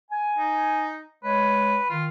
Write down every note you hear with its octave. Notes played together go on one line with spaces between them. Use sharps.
G#5
D#4
G#3 B4 C#5
D#3 F4